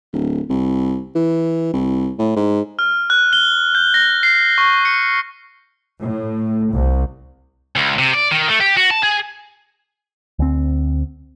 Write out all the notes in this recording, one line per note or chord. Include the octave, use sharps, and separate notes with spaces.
D1
C2
E3
C2
A2
G#2
F6
F#6
G7
G6
A#6
C7
C#6
C#7
A2
C2
C#2
C3
D5
D#3
A3
G4
F#4
A5
G#4
D2 C4